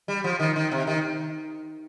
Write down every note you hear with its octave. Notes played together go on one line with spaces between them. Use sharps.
G3
F3
D#3
D#3
C3
D#3